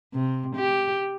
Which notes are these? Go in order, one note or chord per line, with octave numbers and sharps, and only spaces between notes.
C3
G4